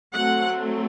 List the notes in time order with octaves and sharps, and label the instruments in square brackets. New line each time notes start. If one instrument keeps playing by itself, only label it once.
[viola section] F#3 A3 C4 F#5